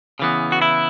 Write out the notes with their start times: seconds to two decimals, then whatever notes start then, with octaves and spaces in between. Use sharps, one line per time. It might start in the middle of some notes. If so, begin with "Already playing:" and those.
0.19 C#3 E3 B3
0.52 F#4
0.62 E4